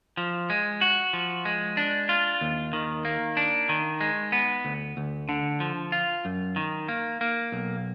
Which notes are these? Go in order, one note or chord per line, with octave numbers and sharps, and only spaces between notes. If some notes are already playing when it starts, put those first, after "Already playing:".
F3
G#3
F#4
F3
G#3
D4
F4
D#2
D#3
A#3
D4
D#3
G#3
B3
D2
D2
D3
F3
F4
F#2
D#3
A#3
A#3
B1